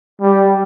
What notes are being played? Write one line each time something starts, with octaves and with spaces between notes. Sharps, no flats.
G3